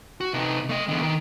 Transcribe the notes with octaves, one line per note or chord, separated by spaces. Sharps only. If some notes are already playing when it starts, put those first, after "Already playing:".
F#4
C3 D#4
A3 D#5
E2 D3
D#3